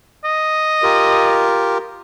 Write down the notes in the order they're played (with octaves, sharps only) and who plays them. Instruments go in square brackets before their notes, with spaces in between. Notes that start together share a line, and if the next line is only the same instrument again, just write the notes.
[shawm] D#5
[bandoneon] F4 G4 A#4